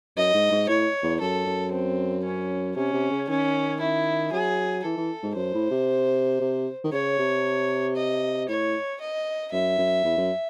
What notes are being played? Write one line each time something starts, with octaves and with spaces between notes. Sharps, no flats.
F#2 D#5
G#2
G#2
A2 C#5
E2
F#2 A4
F#2
C4
C#4
C3 C#4
C3
C#3
D#3 C#4
E4
F#3 G#4
E3 A4
E3
G#2
F#2 C5
A2
C3
C3
D#3
C#3 C#5
C3
D#5
A2 C#5
D#5
F#2 E5
F#2
E2
F#2